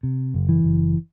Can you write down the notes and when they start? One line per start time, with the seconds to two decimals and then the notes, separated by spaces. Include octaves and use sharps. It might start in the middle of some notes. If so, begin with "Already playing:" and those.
0.03 C3
0.34 F#1
0.49 E3
0.64 F#1